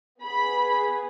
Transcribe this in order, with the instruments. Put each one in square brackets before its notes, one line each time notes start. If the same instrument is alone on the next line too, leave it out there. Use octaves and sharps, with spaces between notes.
[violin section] B3 G#4 B5